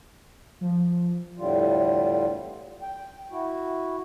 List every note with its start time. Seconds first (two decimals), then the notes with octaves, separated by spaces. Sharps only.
0.61 F3
1.38 E2 A2 D3 G3 F4
2.82 G5
3.31 E4 F#4